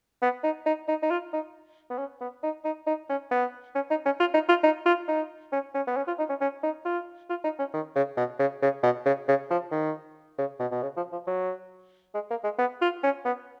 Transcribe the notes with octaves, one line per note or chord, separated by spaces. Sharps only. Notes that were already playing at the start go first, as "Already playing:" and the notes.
B3
D#4
D#4
D#4
D#4
F4
D#4
B3
C#4
B3
D#4
D#4
D#4
C#4
B3
C#4
D#4
C#4
F4
D#4
F4
D#4
F4
D#4
C#4
C#4
B3
C#4
F4
D#4
C#4
C#4
D#4
F4
F4
D#4
C#4
D#3
C#3
B2
C#3
C#3
B2
C#3
C#3
F3
D#3
C#3
B2
B2
C#3
F3
F3
F#3
G#3
A#3
G#3
B3
F4
C#4
B3